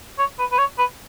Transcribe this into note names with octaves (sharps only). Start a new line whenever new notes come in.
C#5
B4
B4
C#5
B4